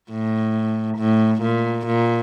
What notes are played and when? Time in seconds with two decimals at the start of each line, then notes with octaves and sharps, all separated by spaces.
0.11 A2
0.98 A2
1.42 A#2
1.87 A#2